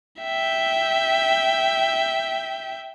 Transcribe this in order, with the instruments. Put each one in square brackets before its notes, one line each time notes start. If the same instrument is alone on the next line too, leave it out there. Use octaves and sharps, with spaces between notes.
[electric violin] E5 G5